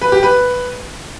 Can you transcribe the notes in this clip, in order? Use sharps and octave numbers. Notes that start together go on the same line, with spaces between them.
B4
G4
B4